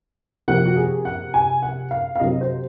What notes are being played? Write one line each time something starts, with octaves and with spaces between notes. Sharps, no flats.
C3 F3 A#3 F#5
F#4
G#4
F#5
G#5
F#5
F5
F5
C3 F#3 C4 D#5
C5